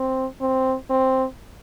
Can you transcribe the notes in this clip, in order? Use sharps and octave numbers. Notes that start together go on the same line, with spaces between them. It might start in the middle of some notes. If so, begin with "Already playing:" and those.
Already playing: C4
C4
C4